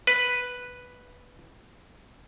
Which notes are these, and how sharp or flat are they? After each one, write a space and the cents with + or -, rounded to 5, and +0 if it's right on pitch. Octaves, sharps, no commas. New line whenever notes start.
B4 +0